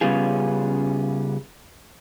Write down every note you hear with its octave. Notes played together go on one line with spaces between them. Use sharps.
C#3 G3 B3 C#4 F4 G#4